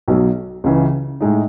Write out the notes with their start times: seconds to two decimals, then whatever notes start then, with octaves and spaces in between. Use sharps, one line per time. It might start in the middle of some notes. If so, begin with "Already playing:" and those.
0.08 B1 B2 F#3
0.64 C#2 C#3 E3
1.21 A2 G#3 D#4